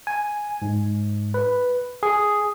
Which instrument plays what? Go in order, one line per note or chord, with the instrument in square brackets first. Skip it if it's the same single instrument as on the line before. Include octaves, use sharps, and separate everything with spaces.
[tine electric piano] G#5
G#2
B4
G#4